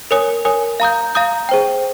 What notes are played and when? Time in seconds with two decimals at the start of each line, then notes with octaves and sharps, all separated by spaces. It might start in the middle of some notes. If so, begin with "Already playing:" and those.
0.11 A#4 C#5 G#5 D#6
0.45 A#4 C#5 G#5 D#6
0.80 F5 A#5 D#6 G6
1.15 F5 A#5 D#6 G6
1.49 G#4 C5 G5